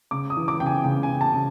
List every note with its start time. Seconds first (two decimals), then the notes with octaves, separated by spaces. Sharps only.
0.11 C#3 D6
0.30 D#6
0.37 E3
0.48 D6
0.60 C#3 G5
0.66 G#5
0.84 C#3 G5
1.03 G#5
1.09 C#3
1.21 A5
1.34 C#3